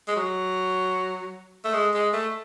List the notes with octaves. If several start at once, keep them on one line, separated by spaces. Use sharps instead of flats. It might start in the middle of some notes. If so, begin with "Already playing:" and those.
G#3
F#3
A3
G#3
G#3
A3